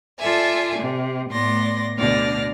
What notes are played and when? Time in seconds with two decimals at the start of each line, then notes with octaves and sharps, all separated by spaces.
0.19 F4 A4 D5 E5 G#5
0.79 C3
1.30 A2 A3 B3 D5 C6 A#6
1.97 D2 B2 D3 D5 F6 A#6